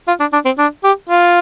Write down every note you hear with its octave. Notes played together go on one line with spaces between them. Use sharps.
F4
D4
D4
C4
D4
G4
F4